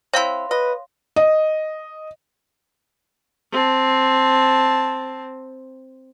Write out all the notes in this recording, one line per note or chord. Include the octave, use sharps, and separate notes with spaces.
C4 E4 C#5 F5 C6
B4 D#5
D#5
C4 A5